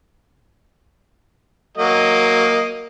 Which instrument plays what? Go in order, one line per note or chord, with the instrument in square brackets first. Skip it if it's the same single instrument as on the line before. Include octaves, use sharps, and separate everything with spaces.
[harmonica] F#3 A#3 D#5